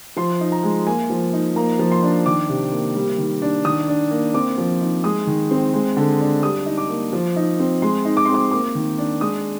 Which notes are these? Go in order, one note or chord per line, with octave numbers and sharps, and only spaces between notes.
F3 C6
D#4
A#5
G#3
A#3 G#5
F3
D#4
A#3 A#5
F3
C6
D4
D#3 D6
C3
A#3
G3
D#3
D4
D#3 D#6
D4
A#3
C4 D6
F3
D#4
G#3 D#6
D#3
C4
G#3
D3
D4
G3 D#6
D#4
D6
A#3
F3
D#4
C4
G#3 C6
D#4
D6
C4 C6
D6
A#3 D6
D#3
D4
G#3 D#6